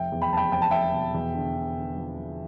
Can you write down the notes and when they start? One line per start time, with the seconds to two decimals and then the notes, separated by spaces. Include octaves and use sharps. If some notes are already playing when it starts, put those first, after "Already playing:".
Already playing: F1 E5 G5
0.12 E2
0.22 G5 B5
0.32 F1 A5
0.37 G5 B5
0.52 F1 G5
0.62 A5
0.71 F1 E5 G5
0.93 B2
1.14 E2
1.34 D3
1.56 D3
1.76 D3
1.96 F3
2.17 F3